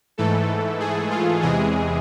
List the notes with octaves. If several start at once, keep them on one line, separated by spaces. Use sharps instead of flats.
G#2 E3 A3 A4
G#4
F4
E2 C3 E3 G#3 G#4